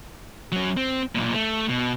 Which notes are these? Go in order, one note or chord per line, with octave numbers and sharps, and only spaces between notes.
F#3 C#4
C4
B1 A#2
A3
B2